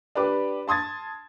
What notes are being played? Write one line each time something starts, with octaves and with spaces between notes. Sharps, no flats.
D4 G4 B4 D6
A5 C6 D#6 G#6 A6